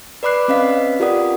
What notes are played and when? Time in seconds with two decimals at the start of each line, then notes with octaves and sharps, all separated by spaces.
0.23 B4 D5 B5 D6 F#6 C7
0.48 C4 C#4 B4 D#5 F5 B6
1.00 F4 G4 A#4 D5 F#5 D#6